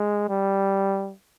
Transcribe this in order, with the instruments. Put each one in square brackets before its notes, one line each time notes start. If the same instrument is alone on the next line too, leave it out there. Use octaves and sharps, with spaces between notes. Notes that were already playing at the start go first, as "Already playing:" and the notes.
Already playing: [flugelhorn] G#3
G3